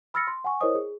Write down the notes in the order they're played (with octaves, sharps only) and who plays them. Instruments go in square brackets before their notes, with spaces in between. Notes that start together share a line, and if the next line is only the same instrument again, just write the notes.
[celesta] B5 E6 F6 A6 A#6 C#7
C6
F#5 G#5 C#6
E4 A#4 C5 C#5 D#5 D#6
G#4